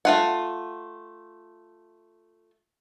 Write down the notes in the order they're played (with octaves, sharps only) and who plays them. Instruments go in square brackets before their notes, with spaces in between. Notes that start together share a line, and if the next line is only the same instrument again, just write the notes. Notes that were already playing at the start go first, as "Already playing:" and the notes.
[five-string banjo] A3 F4 F#5